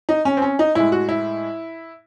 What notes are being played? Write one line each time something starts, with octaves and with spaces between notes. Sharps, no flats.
D#4
C#4
C4
C#4
D#4
A2 G#3 E4
F#4
E4